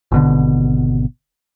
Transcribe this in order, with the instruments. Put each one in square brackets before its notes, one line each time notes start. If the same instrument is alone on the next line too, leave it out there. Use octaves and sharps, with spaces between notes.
[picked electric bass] G#1 B2 D3